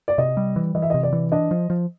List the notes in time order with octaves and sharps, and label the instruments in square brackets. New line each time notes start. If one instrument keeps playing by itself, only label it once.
[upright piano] D5
[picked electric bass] C3 [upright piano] D#5
[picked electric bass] G3
E3
[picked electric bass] E3 [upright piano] D#5
[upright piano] E5
[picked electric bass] C3 [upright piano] D#5
[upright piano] D5
[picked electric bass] E3
[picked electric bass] D4 [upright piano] D#5
[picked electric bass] F3
F3